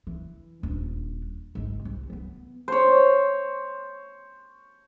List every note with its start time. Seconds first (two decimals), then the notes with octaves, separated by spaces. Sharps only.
0.07 E3
0.63 D#1 D4
1.55 G#1 G#3
1.85 C2
2.10 E3 B3
2.68 C5 C#5